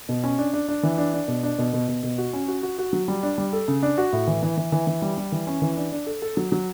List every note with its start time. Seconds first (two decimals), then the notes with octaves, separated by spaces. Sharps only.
0.09 B2
0.24 C#4
0.38 D4
0.53 D4
0.69 D4
0.83 E3
0.98 D4
1.14 D4
1.28 B2
1.43 D4
1.58 B2
1.73 B2
1.88 B2
2.03 B2
2.18 F#4
2.33 C#4
2.48 F#4
2.63 F#4
2.78 F#4
2.93 F#3
3.08 G3
3.23 D4
3.38 G3
3.53 A4
3.68 C#3
3.83 D4
3.98 F#4
4.13 A2
4.27 E3
4.43 E3
4.57 E3
4.72 E3
4.87 E3
5.02 G3
5.18 G3
5.32 E3
5.47 C#4
5.62 E3
5.77 D4
5.92 D4
6.06 A4
6.22 A4
6.37 F#3
6.52 F#3